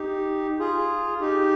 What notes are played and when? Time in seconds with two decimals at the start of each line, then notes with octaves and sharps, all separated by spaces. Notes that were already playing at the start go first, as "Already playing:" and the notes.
Already playing: D#4 G4
0.59 F4 G#4
1.21 D#4 G4